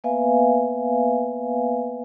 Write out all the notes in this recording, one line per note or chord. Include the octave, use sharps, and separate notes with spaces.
A#3 B3 B4 E5 F5 G#5